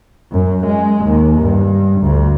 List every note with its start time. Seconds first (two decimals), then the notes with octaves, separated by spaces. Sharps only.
0.32 F#2
0.66 G#3
1.05 D#2
1.40 G2
2.02 D2